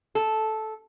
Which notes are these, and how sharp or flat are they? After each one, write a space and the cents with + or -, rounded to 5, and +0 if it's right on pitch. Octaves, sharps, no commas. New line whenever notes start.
A4 -10